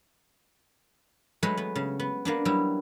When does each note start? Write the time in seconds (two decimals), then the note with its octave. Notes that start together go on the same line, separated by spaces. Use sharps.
1.43 F#3 G#3 A3 B4 C#5
1.57 B3
1.75 C#3
1.99 B3
2.25 A#3 B3 D4
2.45 F#3 G3 E4